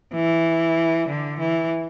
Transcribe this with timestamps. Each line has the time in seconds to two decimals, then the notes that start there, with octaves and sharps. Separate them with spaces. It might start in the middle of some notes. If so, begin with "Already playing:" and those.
0.14 E3
1.08 D3
1.39 E3